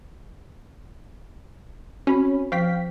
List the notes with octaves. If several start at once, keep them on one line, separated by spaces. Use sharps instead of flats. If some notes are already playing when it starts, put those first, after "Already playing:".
C4 C#4 F#4 B5
F3 F5 G5 B6